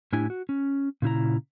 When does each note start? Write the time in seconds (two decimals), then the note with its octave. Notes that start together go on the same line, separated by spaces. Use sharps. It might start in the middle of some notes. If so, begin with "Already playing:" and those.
0.13 A2 D4 E4 G4 G#5
0.30 F#4
0.49 C#4
1.02 A#2 C#3 E4 A#5